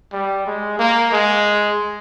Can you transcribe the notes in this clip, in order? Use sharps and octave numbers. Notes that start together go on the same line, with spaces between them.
G3
G#3
A#3
G#3